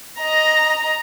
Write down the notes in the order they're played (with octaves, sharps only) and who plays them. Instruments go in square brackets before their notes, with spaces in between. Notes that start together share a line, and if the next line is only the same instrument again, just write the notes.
[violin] D#5 A#5